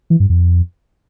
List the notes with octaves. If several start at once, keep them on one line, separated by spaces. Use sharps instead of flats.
E3
G2
F2